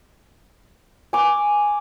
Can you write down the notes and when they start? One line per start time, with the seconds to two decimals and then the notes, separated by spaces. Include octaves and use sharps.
1.13 G#5 D6